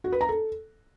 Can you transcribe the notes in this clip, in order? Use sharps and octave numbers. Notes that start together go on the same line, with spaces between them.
F#4
B4
A#5
A4